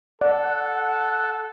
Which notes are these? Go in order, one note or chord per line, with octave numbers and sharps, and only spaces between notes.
A4 D5 F#5